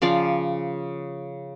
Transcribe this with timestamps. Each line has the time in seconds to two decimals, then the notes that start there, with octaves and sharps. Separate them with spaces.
0.02 C#3 F3 D5 F5